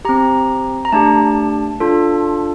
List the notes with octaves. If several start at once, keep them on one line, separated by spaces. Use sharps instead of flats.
C4 G4 A#5
A#5
A3 D4 G4 A5
D4 F4 A4